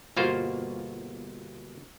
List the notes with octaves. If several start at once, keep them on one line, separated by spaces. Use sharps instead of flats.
G1 B2 A#3 F4 F#4 C5